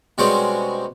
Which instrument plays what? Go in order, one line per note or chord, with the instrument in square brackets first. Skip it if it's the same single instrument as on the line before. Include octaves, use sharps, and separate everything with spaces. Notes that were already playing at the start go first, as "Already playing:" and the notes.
[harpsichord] B2 G3 G#3 C4 C#4